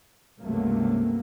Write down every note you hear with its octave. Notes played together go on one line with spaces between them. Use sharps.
C#2 G2 C3 F#3 A3 A#3